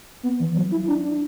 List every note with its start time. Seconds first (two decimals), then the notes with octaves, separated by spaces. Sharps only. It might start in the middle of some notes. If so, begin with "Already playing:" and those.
0.23 B3
0.40 E3
0.56 F#3
0.72 E4
0.88 D4
1.04 D4